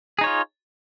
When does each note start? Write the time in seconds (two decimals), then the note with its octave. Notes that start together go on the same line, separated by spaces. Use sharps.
0.19 G#4
0.21 D#4
0.24 C#5
0.26 F4